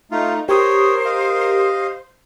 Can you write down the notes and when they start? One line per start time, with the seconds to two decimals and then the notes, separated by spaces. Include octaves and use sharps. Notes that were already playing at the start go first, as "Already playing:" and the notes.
0.12 A3 D#4 F4
0.49 G4 A#4 C5 C#5 D#6
1.05 D#5 F5